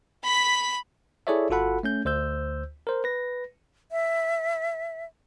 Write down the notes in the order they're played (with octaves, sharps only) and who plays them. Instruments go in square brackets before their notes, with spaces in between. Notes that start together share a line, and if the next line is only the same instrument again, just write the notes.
[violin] B5 B6
[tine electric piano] E4 G#4 A4 C#5 D5 E5
G1 F4 F#4 A4 F#5 B5
A3 C#4 G6
D2 C5 E6 G6
A#4 C5
B4 A#6
[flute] E5